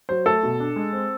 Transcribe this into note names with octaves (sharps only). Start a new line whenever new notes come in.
F#3 C5
A3 A4
B2
D4
G#3
C4